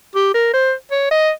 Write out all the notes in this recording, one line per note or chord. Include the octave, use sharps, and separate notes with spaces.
G4
A#4
C5
C#5
D#5